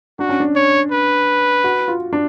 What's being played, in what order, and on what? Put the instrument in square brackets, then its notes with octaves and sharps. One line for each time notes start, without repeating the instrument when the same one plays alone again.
[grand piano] D4 [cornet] F#4
[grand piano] C#4
D4
[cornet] C#5
B4
[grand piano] F#4
F4
D4